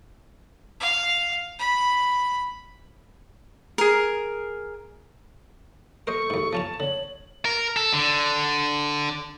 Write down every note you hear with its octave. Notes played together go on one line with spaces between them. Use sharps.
F5
B5
G#4 A#4
A4 A#4 C5 D#5 C#6
D#2 G#2
F3 C#4 A5 A#5
D3 C#5 F#7
A#4
A4
D3